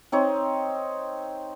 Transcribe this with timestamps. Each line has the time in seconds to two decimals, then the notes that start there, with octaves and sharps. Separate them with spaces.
0.12 C4 D#4 C#5